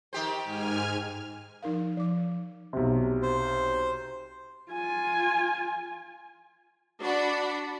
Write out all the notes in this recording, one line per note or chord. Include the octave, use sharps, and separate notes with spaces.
D#3 G4 C5
G#2 G#5 F6
F3 D#4 A#4 F5
F3 D6
B1 C3
C5
F4 G#5
D4 F#4 D5 F#5 B5